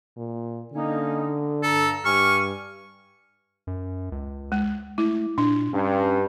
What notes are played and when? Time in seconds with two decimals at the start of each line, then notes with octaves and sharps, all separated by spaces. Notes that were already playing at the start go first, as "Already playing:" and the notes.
0.17 A#2
0.73 D3 A#3 C#4 D#4
1.63 G2 A4 A#5 E6
2.05 G2 G4 G#5 C#6 F6
3.67 F#2
4.12 C#2
4.52 G#3
4.98 A3 E4
5.38 A#2 D4
5.73 G2 C#4